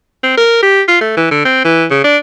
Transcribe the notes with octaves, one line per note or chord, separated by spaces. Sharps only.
C4
A#4
G4
F4
A3
E3
D3
C4
E3
C#3
D4